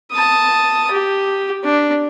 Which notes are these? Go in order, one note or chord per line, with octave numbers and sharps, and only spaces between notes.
A5 D#6
G4
D4